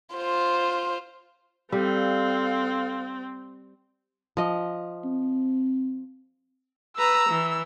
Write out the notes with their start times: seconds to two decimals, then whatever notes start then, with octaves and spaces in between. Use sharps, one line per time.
0.15 F4 C5
1.72 G3 C4 A4 F5
4.37 F3 D#5
5.05 C4
6.98 B4 A#5 E6
7.29 E3